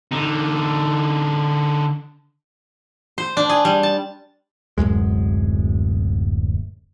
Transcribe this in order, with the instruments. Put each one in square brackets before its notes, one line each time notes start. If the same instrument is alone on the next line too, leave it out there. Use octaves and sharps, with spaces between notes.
[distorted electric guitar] D3 D#4
[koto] C5
D4
G#4
G3
A5
[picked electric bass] D1 B1 F#2 G#3